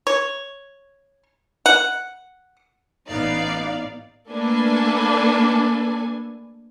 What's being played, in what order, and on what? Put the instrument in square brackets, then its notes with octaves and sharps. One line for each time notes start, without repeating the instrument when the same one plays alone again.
[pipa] C#5
F#5
[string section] A1 A2 B3 D#4 D5 F5
A3 A#3 D4 A4 B4 G#5